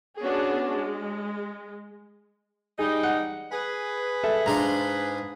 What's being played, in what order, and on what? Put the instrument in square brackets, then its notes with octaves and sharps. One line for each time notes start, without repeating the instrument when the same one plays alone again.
[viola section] B3 C#4 D4 F#4 G#4
G#3
[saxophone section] G3 D#4 [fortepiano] G#4
[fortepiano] F#5
[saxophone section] G#4 B4
[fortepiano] A4 E5
[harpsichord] G#2 D4 F4 [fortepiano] A#5